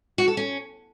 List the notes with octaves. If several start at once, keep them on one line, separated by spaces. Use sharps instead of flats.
F#4
A4
C#4